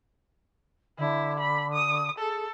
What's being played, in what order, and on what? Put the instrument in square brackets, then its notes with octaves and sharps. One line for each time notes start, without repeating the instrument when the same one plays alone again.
[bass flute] D3 [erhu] E4
[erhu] B5
D#6
[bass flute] G#4 [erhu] A4